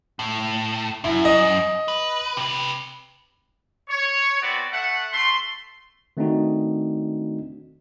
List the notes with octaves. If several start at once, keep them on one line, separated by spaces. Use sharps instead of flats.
A2
F#2 E4
D#5
B4
C3 B4
C#5
B3 C4 F#4 D5
A3 E5 F#5
A3 C6
D#3 A3 C4 D4 D#4 F#4